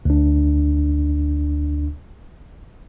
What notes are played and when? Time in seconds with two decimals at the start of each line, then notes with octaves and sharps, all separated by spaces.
0.05 D2 D4